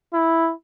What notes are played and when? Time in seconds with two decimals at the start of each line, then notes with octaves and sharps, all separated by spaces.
0.14 E4